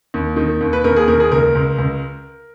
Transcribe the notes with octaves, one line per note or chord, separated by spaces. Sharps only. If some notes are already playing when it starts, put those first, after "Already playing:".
D#2
D#3
D#2
B4
D#2 A#4
G#4
D#2 A#4
G#4
C#2 A#4
C#2
C#2